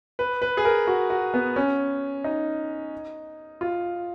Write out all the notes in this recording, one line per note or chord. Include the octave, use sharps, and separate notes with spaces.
B4
B4
G#4
A#4
F#4
F#4
B3
C#4
D#4
F4